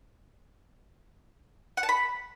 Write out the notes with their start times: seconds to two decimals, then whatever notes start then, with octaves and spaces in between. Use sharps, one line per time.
1.77 F#5
1.83 A5
1.89 B5